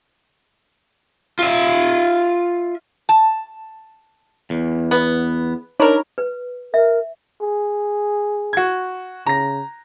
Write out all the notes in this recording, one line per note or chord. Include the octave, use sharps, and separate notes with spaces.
F4 E5
A5
E2
B3
D4 D#4 A#4 C#5 B5
B4
A#4 E5
G#4
F#4 G#6
C#3 A#5 A#6